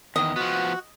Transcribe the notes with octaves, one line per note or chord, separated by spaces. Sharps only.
E2 D#3 D#5
F3 B3 F#4